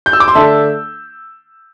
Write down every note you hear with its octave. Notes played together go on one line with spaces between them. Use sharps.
G6
E6
D6
C6
D3 A3 D4 E5 A5